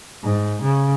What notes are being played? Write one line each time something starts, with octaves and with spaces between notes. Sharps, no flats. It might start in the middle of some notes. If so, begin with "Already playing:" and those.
G#2
C#3